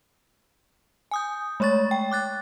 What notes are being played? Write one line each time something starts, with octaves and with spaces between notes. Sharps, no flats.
G#5 D#6 G6
G#3 A3 C#5 C#6 A6
G5
D6 F#6 A6